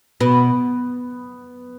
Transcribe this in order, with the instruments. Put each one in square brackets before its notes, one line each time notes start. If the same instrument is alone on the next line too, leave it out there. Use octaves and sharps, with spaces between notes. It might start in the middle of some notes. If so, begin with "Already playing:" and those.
[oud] B2 [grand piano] B3